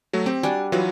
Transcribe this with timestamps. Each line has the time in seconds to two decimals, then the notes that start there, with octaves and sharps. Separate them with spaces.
0.13 F#3 A3 F#4
0.26 C4 G4
0.43 G3 D4 F#4 G#5
0.72 E3 F#3 D#4 F4 F#4 B4